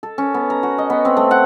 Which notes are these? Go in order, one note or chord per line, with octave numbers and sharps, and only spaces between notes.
A4
C#4
B3
A#5
F#4
D#5
B3
C4
A3
F#5